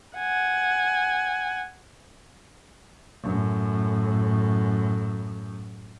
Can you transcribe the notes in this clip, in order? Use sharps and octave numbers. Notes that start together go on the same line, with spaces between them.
F#5 G#5
F#2 A2